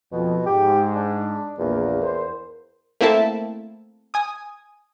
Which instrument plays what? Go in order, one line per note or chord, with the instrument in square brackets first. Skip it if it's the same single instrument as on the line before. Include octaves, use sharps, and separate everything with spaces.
[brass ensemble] F2 [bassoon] B2
[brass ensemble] G#2 [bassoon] G4
[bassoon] D4
[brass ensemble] A#1 A#3 [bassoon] E2
[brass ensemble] A#4 C5
[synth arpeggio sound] A3 A#3 C4 E4 E5 A5
G#5 D#6